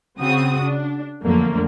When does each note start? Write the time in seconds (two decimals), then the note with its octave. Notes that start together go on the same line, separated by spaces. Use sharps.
0.19 C#3 C4 F#4 D#6
0.62 D4
1.23 F2 D3 F#3 A3 A#3